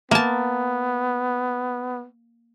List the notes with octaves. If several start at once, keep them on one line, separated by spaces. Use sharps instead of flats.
A#3 B3 A5